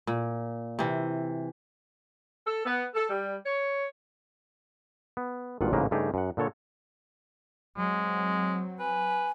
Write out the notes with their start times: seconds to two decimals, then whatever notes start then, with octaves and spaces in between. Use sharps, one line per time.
0.07 A#2
0.79 C3 E3
2.46 A4
2.65 B3
2.94 A4
3.09 G3
3.46 C#5
5.17 B3
5.61 G#1 G2 A#2 F4 F#5
5.73 A1 G#2 C#3 A#3 A#4 B4
5.91 G2 C#3 A3 D#4 G4 G#4
6.14 F#2 F#5
6.37 A#2 D3 A4 C#5
7.78 F#3 G#3 C4
8.79 B4 G#5